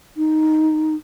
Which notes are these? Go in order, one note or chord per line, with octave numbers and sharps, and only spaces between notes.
D#4